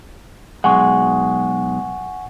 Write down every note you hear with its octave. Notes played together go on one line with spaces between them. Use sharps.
B1 G#3 F#5 G#5 C#6